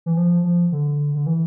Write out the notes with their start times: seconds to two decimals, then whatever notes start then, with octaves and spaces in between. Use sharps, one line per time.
0.06 E3
0.17 F3
0.44 F3
0.72 D3
1.15 D3
1.26 E3